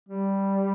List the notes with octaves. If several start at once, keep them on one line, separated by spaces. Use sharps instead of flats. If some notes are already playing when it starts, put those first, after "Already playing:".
G3